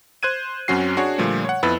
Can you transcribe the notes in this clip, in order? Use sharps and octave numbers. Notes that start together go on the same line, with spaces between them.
C5 F#6 G#6 D#7
F#2 F#3 C4 C#4 F#4 C7
D4 F#4 G#4 C#5
A#2 D3 F3 G3 A3
C#5 F#5
F2 B3 E4 B4 E6 A6